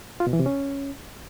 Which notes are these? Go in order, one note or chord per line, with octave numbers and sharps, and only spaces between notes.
F4
B2
E3
C3
C#4